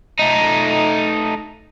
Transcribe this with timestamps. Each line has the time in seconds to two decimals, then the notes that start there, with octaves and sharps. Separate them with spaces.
0.19 A3 D#4